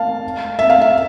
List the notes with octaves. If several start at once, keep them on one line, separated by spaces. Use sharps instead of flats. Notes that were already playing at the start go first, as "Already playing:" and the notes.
Already playing: F5 A5
E5
F5
E5